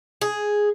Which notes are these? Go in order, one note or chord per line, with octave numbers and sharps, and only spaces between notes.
G#4